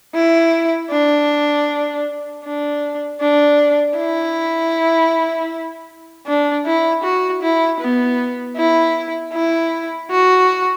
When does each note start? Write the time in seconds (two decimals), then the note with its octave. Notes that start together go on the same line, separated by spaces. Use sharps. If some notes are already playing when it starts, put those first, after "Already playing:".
0.15 E4
0.91 D4
2.44 D4
3.21 D4
3.97 E4
6.27 D4
6.66 E4
7.04 F#4
7.43 E4
7.81 B3
8.57 E4
9.33 E4
10.11 F#4